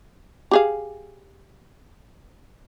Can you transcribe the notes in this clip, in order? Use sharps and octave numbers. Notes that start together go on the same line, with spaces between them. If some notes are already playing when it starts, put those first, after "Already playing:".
G4 G#4 F5